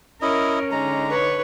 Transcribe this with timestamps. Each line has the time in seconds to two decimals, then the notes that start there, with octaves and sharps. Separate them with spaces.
0.22 C#4 E4 A#4 D#5
0.72 D3 G#3 D#4 A#5
1.10 B4 C#5